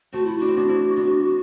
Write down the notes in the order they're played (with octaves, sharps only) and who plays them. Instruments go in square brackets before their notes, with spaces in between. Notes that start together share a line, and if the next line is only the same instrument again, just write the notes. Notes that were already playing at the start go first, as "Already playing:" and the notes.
[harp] A3 C4 [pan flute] F#4
[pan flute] E4
[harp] D4 [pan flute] F#4
[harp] C4
B3 D4
C4 E4
B3 D4